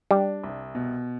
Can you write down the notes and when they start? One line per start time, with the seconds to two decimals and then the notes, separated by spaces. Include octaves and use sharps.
0.11 G3 D4
0.44 C2
0.75 B2